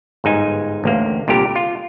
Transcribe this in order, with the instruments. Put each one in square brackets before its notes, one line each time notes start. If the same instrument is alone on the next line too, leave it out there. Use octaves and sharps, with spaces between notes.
[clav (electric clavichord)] G1 G#2 D#4 G#5
A1 D2 A#3
C2 A#2 D3 G4 A#4
F4